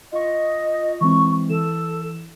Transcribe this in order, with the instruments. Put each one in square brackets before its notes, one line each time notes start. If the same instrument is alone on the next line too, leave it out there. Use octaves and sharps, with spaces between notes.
[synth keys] F4 C#6 [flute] D#5
[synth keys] E3 G#3 C4 [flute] C#6
[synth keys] E3 E7 [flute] A4